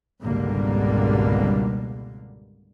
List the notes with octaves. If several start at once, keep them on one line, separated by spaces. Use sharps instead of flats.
G#1 C#2 B2 D3 G3 A#3